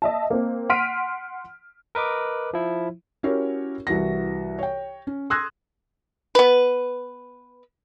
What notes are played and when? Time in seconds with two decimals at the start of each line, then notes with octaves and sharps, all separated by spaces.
0.02 D#5 E5 A5
0.30 A#3 C4
0.69 F#5 C6 F6 B6 D7 D#7
1.95 A#4 B4 D#5 D6
2.53 F3 E4
3.23 C#4 E4 F#4 G4 A#4 C#5
3.87 C2 E3 F#4 A#6
4.59 C#5 G5
5.07 C#4
5.30 C6 D#6 E6 F#6 G#6 A#6
6.35 B3 B4